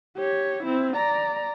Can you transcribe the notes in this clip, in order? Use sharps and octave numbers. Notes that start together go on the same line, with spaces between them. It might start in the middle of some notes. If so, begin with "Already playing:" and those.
G4 C#5
C4 E4
D5 A#5